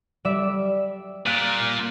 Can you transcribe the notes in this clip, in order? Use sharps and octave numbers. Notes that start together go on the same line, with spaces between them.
G3 D5 E5
A#2 F#6 D7 D#7